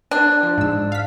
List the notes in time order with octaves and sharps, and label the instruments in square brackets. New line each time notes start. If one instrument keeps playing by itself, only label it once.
[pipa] D4
[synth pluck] F3
G#2 E6
F5 B6